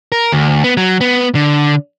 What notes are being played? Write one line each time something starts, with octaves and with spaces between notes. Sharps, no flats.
A#4
D2
B3
F#3
B3
D3